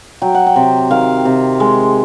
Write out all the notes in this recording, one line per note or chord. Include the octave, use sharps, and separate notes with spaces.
F#3 G5
F#5
G5
C3
D#3 F5
C3
G#3